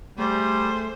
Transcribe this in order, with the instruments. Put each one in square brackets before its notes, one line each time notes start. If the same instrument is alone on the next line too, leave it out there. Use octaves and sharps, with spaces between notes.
[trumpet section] G3 [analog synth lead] A3 [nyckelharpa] G#4 [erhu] C5